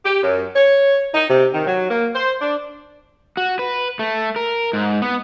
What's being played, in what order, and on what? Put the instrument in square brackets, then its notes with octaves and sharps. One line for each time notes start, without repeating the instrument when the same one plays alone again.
[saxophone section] G4
F#2
C#5
D#4
C3
D#3
F#3
A#3
C5
D4
[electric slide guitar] F#4
B4
A3
A#4
G#2
B3